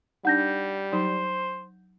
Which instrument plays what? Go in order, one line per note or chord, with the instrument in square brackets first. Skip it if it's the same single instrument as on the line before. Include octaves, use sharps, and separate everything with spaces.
[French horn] G3 [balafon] D4 D#4 [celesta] F#5 G6 A#6
[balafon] F#3 D#4 [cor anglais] C5